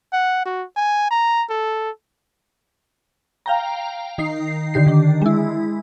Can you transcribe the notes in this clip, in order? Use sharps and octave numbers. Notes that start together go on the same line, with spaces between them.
F#5
F#4
G#5
A#5
A4
F5 G5 A#5
D#3 D#4 C7
D3 D#3 G4 C7
D#3 D4
G#3 E4